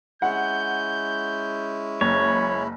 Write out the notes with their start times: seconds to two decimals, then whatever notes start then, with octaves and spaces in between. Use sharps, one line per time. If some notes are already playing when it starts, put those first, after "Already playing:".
0.22 G#3 C#4 E4 F#5 G6
2.01 F#1 C#5 B5